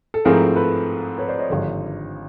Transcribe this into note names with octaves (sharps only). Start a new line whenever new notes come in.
A4
G#2 F3 A3 C4 E4 G#4 A#4
A4 B4
B4 C#5
C5 D5
C#5 D#5
G#1 G2 D3 F3